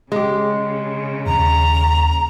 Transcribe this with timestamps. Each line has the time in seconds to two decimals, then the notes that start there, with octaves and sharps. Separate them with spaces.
0.12 C#3 G#3 G4
1.26 D#2 A#5